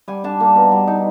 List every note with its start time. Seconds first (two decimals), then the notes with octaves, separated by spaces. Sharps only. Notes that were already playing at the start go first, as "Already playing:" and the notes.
0.08 G3 G#5
0.24 D4 A5
0.40 A#3
0.56 B2
0.72 G3
0.87 D#4